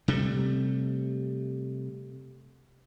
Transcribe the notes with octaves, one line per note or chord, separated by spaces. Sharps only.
C3 G3 A3